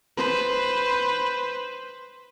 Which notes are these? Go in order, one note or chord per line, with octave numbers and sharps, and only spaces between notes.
B4 C5